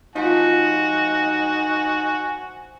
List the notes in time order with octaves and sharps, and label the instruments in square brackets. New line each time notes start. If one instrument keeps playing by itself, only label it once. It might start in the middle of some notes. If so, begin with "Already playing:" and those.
[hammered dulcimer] F3 [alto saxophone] D#4 [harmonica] F#4 [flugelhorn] G#5